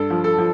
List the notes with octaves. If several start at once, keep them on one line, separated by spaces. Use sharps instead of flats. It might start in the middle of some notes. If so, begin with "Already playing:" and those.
Already playing: G2 A4
F3
A4
F3